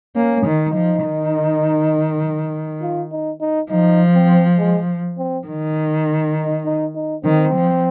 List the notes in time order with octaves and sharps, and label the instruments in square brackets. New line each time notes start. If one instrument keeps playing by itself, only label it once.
[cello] A#3 [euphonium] C#4
[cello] D#3
[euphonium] D#4
[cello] F3
D#3
[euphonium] F4
D#4
D#4
[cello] F3 [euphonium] D#4
[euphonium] C4
G#3
C4
[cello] D#3
[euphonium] D#4
D#4
D#4
[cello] D#3 [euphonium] C4
[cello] F3